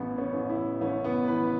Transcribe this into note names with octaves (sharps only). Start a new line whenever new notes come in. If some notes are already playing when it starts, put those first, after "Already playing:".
Already playing: A1 B3
C#4
A1
E4
A1 C#4
B3
E3 B4